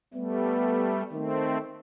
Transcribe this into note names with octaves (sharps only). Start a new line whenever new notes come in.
G3 A3 B3
D#3 A3 C4